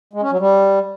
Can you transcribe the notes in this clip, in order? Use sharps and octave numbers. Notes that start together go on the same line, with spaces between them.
G#3
C#4
F#3
G3